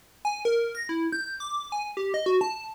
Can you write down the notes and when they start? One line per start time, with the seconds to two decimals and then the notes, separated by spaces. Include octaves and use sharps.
0.25 G#5
0.45 A#4
0.75 A#6
0.89 E4
1.12 G6
1.40 D6
1.72 G#5
1.97 G4
2.14 D#5
2.26 F#4
2.41 A5